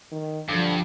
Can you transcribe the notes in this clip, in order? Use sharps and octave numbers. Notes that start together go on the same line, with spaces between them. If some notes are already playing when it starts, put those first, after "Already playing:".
D#3
G2 D3 F3